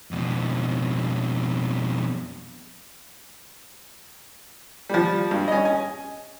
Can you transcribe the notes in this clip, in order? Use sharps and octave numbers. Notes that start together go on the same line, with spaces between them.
F2 B2
F3 G3
G2
C#4 D#5
G#5